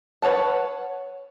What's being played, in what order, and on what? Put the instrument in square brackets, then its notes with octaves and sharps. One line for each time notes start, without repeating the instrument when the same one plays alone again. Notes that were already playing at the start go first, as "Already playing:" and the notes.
[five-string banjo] B4 C#5 F#5 A5